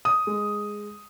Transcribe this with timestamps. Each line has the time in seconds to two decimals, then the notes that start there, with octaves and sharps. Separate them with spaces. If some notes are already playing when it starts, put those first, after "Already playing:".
0.05 D#6
0.27 G#3